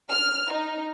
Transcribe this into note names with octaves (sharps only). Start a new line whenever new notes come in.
F6
D#4